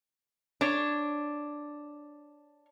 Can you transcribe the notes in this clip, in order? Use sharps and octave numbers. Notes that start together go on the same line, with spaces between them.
D4 C#5